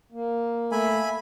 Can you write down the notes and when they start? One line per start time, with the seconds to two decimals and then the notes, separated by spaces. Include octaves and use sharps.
0.12 A#3
0.72 A3 E5 G#5 B5